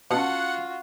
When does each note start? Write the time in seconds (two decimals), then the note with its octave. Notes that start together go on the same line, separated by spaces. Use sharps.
0.11 B2 C#4 F4 F#4 F#5 A5